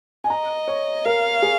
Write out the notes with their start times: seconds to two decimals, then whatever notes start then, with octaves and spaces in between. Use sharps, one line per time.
0.24 G#5
0.30 D#5 A#5
0.68 C#5
1.05 A#4 F5
1.42 G#4